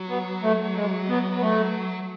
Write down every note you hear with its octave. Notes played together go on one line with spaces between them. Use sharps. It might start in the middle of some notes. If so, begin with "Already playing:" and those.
Already playing: F#3
B3
A3
G#3
B3
B3
A3